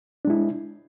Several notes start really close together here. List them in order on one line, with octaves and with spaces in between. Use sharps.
D4 G#3 E4